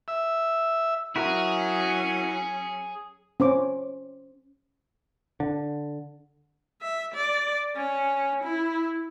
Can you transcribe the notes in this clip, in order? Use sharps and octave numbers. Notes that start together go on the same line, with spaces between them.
E5
F#3 C#4 E4 F#4 G#4 A#4
C#4 C5 D6
D3
E5
D5
C#4
E4